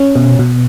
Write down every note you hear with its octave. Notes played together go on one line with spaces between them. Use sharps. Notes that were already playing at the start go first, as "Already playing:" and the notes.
Already playing: C#4
B2
B2